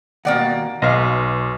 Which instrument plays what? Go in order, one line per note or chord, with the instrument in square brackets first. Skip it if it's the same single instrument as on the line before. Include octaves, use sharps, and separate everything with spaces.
[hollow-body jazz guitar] D#2 B2 [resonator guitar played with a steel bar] A#3 D5 F#5
[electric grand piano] B1 B4 F6 [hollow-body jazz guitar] D#5 F5